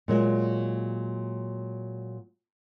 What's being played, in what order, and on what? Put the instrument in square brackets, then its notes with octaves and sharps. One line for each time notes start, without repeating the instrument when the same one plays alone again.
[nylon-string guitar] A#2 F#3 G#3